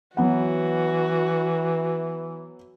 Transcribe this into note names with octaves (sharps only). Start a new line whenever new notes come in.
E3 F#3 B3 F#4 F#5